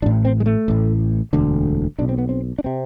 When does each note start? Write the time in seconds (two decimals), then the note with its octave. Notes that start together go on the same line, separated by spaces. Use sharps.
0.02 A1 D4
0.06 A2
0.25 C4
0.40 G#3
0.46 A3
0.68 A1 A2
1.33 E1 D2 D3
1.98 B1 B2 D4
2.09 C4
2.18 B3
2.29 C4
2.58 D4
2.64 C3 C4